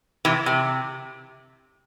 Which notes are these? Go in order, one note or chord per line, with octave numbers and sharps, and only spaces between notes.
C3 E3
C3